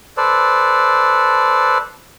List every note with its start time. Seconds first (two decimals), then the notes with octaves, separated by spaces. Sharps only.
0.17 A4 B4 C5 D5